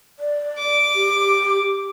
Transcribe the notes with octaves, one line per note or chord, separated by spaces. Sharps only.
D5
D6
G4